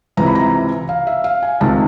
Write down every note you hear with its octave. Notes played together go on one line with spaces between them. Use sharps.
C#2 C3 E3 A#5
B5
A#5
F5
E5
F5
G#5
C#2 C3 D#3 A5